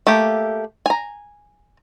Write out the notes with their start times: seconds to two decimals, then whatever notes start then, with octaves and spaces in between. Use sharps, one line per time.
0.07 A3 A#3 G4
0.86 G#5 A#5